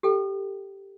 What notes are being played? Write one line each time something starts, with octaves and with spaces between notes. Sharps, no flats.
G4 A4 G5